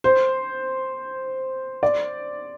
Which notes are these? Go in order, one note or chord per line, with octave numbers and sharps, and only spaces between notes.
C5
D5